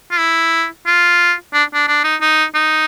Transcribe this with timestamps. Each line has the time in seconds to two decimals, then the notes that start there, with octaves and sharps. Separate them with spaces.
0.11 F4
0.19 E4
0.87 F4
1.53 D4
1.74 D4
1.88 D4
2.04 D#4
2.21 D#4
2.55 D#4